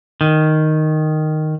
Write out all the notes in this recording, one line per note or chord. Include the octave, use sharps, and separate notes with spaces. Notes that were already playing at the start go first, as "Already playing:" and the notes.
D#3